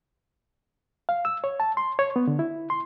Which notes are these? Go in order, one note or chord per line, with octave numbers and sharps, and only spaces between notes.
F5
E6
C#5
A5
C6
C#5
B3
D3
E4
C6